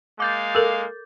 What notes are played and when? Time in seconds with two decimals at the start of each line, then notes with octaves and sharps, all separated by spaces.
0.20 G#3 A#3 F5 D6 G6 A6
0.55 A4 A#4